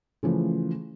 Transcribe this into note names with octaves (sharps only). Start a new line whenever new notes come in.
C#3 E3 F3 A3